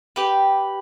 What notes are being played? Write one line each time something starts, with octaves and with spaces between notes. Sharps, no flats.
G4 B4